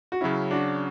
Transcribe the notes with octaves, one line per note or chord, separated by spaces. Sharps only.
F#4
C#3 F#3 C#4 E4
D4 F#4